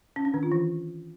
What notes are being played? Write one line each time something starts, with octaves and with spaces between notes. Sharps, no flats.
C#4
D4
D#3
F4
E3